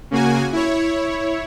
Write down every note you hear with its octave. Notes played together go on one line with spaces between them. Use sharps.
C#3 A#3 F#4 G#5
E4 C#5